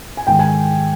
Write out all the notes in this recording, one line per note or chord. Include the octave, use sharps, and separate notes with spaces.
G#5
G#2 D#3 G#3 G5
G#5